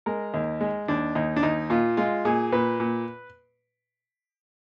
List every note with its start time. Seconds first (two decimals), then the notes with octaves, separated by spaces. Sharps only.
0.06 G#3 A#4
0.34 D#2
0.61 G#3
0.88 D#2 D4
1.15 D#2 D#4
1.36 D4
1.43 D#2 D#4
1.70 A#2 F4
1.97 G#3 F4
2.25 A#2 G#4
2.52 A#2 B4
2.80 A#2